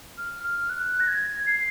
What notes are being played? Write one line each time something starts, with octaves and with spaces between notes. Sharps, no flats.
F6
F6
F#6
A#6
G#6
C7